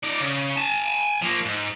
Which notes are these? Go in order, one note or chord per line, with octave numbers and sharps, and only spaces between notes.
D#4 D5
C#3
G#5 A5
F3 A#3
G#2